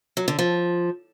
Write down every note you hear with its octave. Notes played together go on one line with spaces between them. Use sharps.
F#3
D3
F3